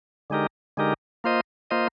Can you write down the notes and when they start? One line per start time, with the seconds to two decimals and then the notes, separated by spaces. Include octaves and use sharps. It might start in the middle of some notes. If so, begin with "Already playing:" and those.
0.30 D3 G#3 D#4 G4 A#4
0.77 D3 G#3 D#4 G4 A#4
1.24 A#3 F4 C5 D#5
1.71 A#3 F4 C5 D#5